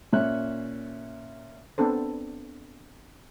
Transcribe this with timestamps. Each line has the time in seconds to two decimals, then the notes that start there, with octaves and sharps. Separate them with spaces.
0.13 A#2 C#4 E5 F#6
1.78 B3 C4 D4 A4 C5